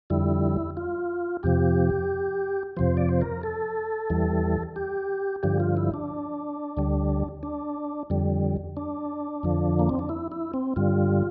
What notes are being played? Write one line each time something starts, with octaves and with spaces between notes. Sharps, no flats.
F2 D3 G3 E4
F4
F2 C3 F3 G4
F2 C3 F3 C5
D5
C5
A#4
A4
E2 E3 G3
G4
G2 D3 F3 G4
F4
E4
D4
D2 D3 G3
D4
F2 D3 G3
D4
F2 D3 F3
A#3
C4
D4
E4
E4
C4
G2 D3 G3 F4